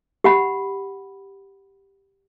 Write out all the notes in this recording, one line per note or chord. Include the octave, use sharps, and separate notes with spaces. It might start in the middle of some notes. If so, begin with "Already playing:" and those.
G4 F#5 B5